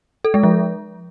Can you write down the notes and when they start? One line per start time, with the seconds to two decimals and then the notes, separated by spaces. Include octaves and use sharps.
0.25 A4
0.34 G#3
0.43 F3